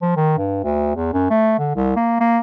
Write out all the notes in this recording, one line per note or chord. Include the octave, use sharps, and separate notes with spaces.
F3
D#3
G2
D2
E2
F#2
A3
D3
C2
A#3
A#3